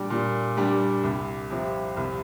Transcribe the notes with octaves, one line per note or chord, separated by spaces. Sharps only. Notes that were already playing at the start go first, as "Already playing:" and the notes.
Already playing: A#2 G3 D4
A#2
G3 D4
C2
C3 F3
C2